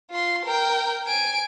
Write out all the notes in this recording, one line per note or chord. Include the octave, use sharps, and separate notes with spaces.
F4 C6
A#4 G5
G#5 D7